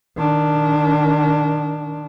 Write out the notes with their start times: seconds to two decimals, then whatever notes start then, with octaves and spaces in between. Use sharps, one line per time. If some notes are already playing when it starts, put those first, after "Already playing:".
0.17 D#3 D4